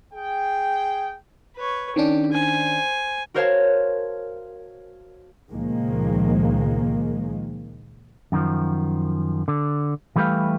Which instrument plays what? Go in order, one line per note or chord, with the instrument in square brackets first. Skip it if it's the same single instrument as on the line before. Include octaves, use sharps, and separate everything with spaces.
[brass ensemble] G#4 G5
[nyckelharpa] B4 C#5
[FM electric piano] D#3 C#4 D4 [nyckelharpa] G4
[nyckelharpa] C5 G#5
[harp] F#4 A#4 C5 C#5 F5 A5
[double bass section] C#2 A#2 D#3 F3 G#3 A#3
[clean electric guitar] F#2 D#3 F3
D3
E3 G3 A3 G4 B4 F5